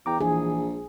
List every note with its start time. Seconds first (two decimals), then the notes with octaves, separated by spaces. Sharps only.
0.06 E2 G5 A#5 D6
0.21 A#1 E3 G#4